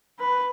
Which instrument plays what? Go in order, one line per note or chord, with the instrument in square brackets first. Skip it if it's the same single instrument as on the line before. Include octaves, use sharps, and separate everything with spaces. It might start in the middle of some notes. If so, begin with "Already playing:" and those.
[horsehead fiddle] B4